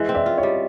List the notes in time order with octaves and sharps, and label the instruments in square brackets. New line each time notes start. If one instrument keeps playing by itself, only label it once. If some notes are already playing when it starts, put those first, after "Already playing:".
Already playing: [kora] E3 G#3
C4
[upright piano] D5 E5
[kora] F4
[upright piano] C#5 D#5
[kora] G3